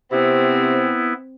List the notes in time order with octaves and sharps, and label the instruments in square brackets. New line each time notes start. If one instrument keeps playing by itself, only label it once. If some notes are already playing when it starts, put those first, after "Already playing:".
[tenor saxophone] C3 [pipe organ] B3 E4 [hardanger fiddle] C4